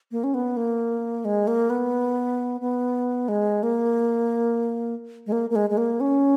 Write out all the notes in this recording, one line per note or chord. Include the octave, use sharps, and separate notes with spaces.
A#3
C#4
B3
A#3
G#3
A#3
B3
B3
G#3
A#3
G#3
A#3
A#3
G#3
G#3
A#3
C#4